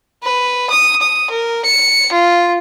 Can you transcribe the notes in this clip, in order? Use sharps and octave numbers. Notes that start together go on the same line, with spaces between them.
B4
D#6
D#6
A#4
C#7
F4